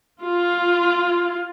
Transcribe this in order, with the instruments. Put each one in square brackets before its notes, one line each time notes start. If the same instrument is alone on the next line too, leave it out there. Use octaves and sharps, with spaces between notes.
[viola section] F4